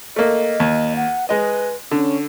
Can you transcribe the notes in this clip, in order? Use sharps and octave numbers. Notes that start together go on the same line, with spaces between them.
A3 A#3 D#5
D#2
F#5
G#3 B4 D#5
D3 C#4